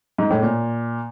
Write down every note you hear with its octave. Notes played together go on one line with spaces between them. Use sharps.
G#2
A2
A#2